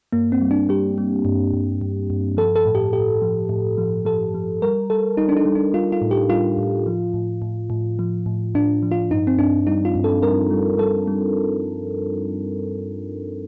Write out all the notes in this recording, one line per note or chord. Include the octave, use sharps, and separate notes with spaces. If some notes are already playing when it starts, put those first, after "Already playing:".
G2 A#3
C4
G3
D4
G3 G4
G3
G2
G2
G2
G2
F3 A4
A4
A2
G4
A2 G4
F3
A2
F3
F3 A4
F3
G3 A#4
G3 A4
G3 D#4
D4
D#4
G3
D4
G3 F4
F4
A2
G4
G3 F4
A2
F3
A2
A2
A2
F3
A2
A2 D4
F3
F4
G2 D#4
C4
G2 D4
G3 D#4
F4
G2
A4
G3 A#4
G3
G3 A4
G3